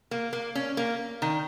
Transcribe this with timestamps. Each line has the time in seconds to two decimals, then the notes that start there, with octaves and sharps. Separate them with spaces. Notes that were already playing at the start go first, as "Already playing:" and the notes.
0.11 A#3
0.33 A#3
0.55 C#4
0.77 A#3
1.22 D#3